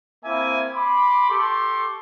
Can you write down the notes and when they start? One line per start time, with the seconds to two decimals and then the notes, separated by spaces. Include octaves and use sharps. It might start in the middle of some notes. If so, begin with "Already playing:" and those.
0.25 A#3 C4 E4 E5 G#5
0.74 B5 C6 D6
1.30 G4 A4 C6 C#6